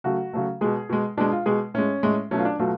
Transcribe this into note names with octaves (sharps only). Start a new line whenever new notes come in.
C#3 F#3 A3 F#4
C#3 F#3 A3
B2 G#3 G#4
B2 G#3
B2 G#3 D4
F4
B2 G#3 G#4
A2 G#3 C#4
A2 G#3
B2 F#3 A3 C#4
F4
D4
B2 F#3 A3 F4